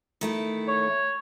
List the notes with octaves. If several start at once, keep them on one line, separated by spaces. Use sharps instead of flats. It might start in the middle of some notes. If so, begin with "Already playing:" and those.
D#3 A3 E4
C#5